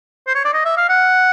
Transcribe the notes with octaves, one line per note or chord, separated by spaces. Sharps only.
C5
C#5
D5
D#5
E5
F5
F#5